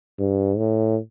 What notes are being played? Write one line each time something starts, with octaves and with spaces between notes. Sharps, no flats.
G2
A2